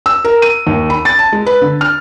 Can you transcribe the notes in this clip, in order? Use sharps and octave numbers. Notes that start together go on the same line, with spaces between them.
E6
A#4
D#7
D#2
B5
A6
A5
G#3
B4
D3
F6